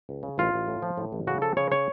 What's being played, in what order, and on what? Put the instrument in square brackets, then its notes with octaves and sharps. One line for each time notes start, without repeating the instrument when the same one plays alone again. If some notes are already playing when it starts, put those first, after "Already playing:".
[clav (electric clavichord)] C#2
C#3
A1 F4
A1
A2
F3
A2
A1
C#3 F#4
F3 A4
C#3 C#5
C#5